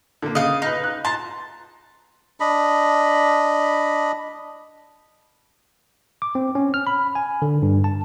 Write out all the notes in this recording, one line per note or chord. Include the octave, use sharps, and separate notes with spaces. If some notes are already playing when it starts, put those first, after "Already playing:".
D3 A#3
C#3 D#5 F5
D#4 B4 F5
F#6
A5 A#5 C6
D4 D#5 B5
D6
C4
C#4
F6
B5
G#5
D3
G2
A5